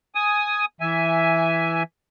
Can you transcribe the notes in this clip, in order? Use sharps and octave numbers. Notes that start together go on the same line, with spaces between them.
G#5 D#6
E3 E5 G#5